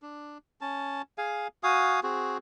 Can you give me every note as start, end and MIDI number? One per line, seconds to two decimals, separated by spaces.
0.02 0.38 62
0.61 1.02 61
0.61 1.02 81
1.18 1.48 68
1.18 1.48 77
1.18 1.48 80
1.63 2.00 66
1.63 2.00 77
1.63 2.00 80
1.63 2.00 87
2.03 2.38 60
2.03 2.38 66
2.03 2.38 68